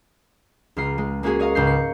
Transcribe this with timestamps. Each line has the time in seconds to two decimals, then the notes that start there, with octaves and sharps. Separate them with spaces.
0.76 C#2 G#3 F4 A#5 C7
0.98 G#3
1.23 G#3 A#3 C#4 F#4 G#4 A#4
1.39 C#5 D#5 F5 A#5
1.55 C#2 G#2 A#5 G6 C7
1.67 C7 C#7